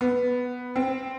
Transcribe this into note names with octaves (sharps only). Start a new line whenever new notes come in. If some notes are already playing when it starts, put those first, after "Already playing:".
B3
C4